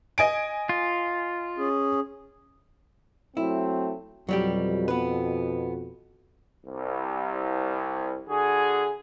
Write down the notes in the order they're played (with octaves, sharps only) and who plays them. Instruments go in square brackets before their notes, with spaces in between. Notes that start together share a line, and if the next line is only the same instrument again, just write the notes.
[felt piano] D#5 G#5 D7
[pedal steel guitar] F4
[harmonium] C#4 G#4
[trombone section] F#3 A3 C4 [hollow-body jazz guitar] E4
[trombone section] F2 B2 [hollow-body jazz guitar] F#3 G3 G4
[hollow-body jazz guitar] B3 B4
[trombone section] C2
D3 F#4 G#4